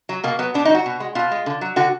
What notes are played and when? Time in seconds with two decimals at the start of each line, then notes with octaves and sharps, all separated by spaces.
0.09 F#3
0.24 B2 A#3
0.39 F#3 B3
0.54 B2 D4
0.65 D#4
0.70 F#3
0.75 F#4
0.86 B2
1.00 G#3
1.15 B2 F4
1.32 G#3
1.46 D3
1.61 F#3
1.76 D3 F#4